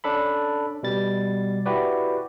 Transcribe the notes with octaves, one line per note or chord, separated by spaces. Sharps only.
C#4 D4 A4 B5
B2 G3 A6
E4 F#4 G4 B4 D5